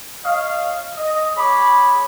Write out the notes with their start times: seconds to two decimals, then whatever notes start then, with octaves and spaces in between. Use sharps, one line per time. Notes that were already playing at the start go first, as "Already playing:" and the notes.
0.24 C#5 D#5 F5
0.97 D#5
1.37 G#3 G#4 C#5 B5 D6